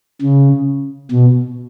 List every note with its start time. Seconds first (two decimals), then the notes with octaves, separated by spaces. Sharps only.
0.22 C#3
1.12 B2